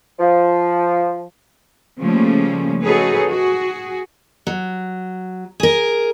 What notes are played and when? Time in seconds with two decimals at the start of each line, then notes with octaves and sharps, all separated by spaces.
0.19 F3
2.00 C#3 F3 G3 A3 A#3 C#4
2.82 D#4 F#4 G#4 A4 B4 C#5
3.28 F#4 G#4
4.47 F#3
5.60 G#4 A#4